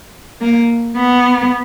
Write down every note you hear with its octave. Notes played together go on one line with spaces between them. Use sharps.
A#3
B3